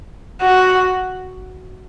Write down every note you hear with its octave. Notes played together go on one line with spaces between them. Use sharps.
F#4